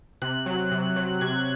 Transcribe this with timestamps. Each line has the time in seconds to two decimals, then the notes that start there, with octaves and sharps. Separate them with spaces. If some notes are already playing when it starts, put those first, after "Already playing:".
0.22 C3 F#6
0.46 F#3
0.72 C3
0.96 F#3
1.21 C3 G#6